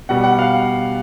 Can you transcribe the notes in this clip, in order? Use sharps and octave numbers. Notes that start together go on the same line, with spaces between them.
B2 G3 F#5
F#5
F5